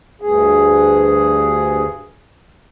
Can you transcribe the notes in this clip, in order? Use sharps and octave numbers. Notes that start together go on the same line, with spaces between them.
D2 G2 G#4